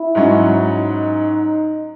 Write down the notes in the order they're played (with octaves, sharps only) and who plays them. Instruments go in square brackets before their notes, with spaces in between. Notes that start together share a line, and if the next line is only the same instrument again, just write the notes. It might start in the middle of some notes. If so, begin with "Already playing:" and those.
Already playing: [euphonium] E4
[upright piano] G#2 F#3 C#4
[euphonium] D#4